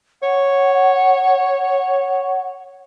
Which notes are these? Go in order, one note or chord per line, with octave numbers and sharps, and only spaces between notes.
C#5 F#5